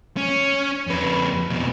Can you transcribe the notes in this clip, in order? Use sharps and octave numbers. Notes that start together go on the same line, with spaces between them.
C#4
F2 B4
F2 B2